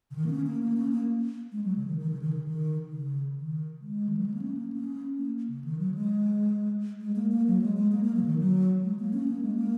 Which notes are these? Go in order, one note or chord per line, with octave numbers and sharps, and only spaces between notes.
C#3
D#3
A#3
C#4
A#3
A#3
C#4
A#3
G#3
F#3
C#3
D#3
D#3
C#3
D#3
C#3
D#3
C#3
D#3
G#3
D#3
F#3
G#3
A#3
C#4
A#3
C#4
A#3
C#3
D#3
F#3
G#3
G#3
A#3
A#3
F#3
G#3
G#3
A#3
A#3
F#3
C#3
D#3
F#3
G#3
A#3
C#4
A#3
G#3
A#3